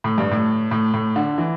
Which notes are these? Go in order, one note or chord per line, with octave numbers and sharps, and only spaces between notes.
A2
G2
A2
A2
A2
D3
E3